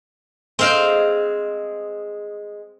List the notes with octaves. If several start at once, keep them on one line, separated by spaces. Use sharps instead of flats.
G#3 C4 D#5 F5 G5